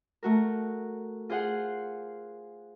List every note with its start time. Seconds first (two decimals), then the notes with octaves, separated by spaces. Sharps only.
0.23 A3 F#4 A#4
1.30 F4 G#4 C5 F5 F#5